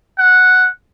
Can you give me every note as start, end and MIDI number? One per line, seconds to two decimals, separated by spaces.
0.19 0.67 78